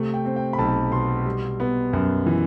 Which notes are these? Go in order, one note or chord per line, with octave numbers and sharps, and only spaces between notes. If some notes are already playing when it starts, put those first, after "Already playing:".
Already playing: C3 A3
G5
C4
G5
B5
B1 A5
B2 C6
G3
B3
F#2
E3